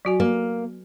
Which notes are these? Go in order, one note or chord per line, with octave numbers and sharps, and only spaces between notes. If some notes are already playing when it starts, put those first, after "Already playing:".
F#3 F#4 G#5
A#3